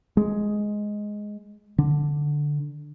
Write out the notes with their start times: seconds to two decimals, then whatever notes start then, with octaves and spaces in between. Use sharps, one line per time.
0.17 G#3
1.78 D3